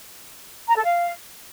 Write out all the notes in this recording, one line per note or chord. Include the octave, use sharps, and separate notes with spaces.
A#5
A4
F5